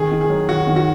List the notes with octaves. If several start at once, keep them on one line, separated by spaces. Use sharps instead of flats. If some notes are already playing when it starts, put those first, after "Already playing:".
Already playing: D#3 G#4
D#3
G#4
F#3
D#3 F#4
D#3
F#4